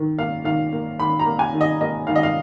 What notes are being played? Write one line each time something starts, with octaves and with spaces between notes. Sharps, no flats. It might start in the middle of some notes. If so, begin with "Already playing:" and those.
Already playing: D#3
A#3 F5
D#3 F5
A#3
D#3 B5
A#5
A#3
G#5
D#3
D#5
A#3 D#5
D#3 F5
D#5
F5